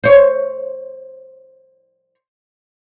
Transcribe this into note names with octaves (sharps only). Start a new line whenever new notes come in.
C5 C#5